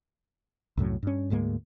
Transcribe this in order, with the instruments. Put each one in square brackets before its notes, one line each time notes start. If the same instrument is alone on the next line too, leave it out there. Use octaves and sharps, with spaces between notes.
[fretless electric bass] C2 F#2 A2 F#3
G2 C#4
D2 G#2 G#3 A#3